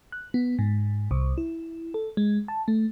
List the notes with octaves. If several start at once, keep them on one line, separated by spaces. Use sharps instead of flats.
F#6
B3
G#2
C2
E4
A4
G#3
A5
A3